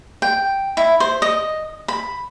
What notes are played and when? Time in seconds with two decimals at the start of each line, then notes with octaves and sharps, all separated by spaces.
0.22 G5
0.77 E4
1.00 C5
1.22 D#5
1.88 B5